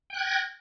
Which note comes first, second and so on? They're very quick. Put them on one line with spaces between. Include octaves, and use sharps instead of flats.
G5 F#6 G#6 A#6